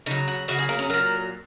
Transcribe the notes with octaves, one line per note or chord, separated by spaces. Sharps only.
C#3 F#3 D#4
F#4
C#3 F#3 F#4
G#4
A#3
C#4
A#2 F#3 A#4